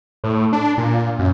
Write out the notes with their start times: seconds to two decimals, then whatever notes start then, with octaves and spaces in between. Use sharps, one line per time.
0.24 A2
0.53 D4
0.78 A#2
1.19 F#2